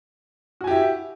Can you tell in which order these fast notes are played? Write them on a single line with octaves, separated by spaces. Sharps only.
F#4 G#5 G4 E4